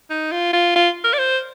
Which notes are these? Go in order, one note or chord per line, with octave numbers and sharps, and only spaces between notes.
D#4
F4
F4
F4
A#4
D5
C5